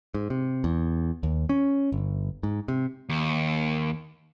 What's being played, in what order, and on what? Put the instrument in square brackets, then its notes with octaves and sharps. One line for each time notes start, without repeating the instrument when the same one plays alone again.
[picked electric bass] G#2
C3
E2
D#2
C#4
G1
G#2
C3
[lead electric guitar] D#2